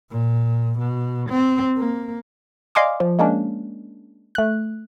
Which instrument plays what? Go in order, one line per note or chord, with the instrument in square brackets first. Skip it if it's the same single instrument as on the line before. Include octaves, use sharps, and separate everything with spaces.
[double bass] A#2
B2
C4
A#3
[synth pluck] D5 D#5 F5 G#5 C6 D6
F3
G#3 A#3 C#4 D4
A3 F#6